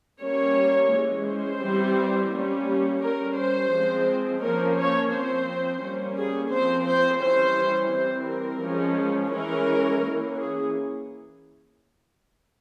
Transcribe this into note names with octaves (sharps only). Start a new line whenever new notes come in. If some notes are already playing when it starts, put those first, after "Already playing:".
G3 A#3 C#4 C#5
E3 G#3 C#4
C5
E3 G3 C4
G3 A#3 C#4
G3 C#4 A#4
C5
F3 G#3 C4
F3 A#3 C#4 A#4
C#5
F3 C4 C5
G3 A#3 C#4
G#4
F3 C4 C5
C5
E3 G3 C#4 C5
E3 G3 C4 C5
A#4
F3 G#3 C#4
E3 G#3 C#4 A#4
E3 A#3 C#4
G#4